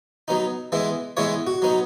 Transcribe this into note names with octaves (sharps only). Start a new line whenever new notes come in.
F#3 B3 D#4
E3 G#3 B3 E4
E3 G#3 B3 E4 C#5
F#4
F#3 B3 D#4